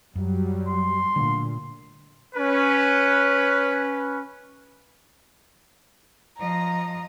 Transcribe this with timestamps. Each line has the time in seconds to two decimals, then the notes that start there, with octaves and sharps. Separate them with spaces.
0.15 F#2 F#3 G3
0.68 C6
1.16 A#2 D3 A3 D4
2.35 C#4 B4
6.39 F3 D#5 A#5